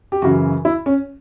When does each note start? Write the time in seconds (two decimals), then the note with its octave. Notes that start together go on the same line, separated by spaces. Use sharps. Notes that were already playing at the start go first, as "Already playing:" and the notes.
0.12 G4
0.22 F#2 C#3 E3 F#4
0.65 E4
0.86 C#4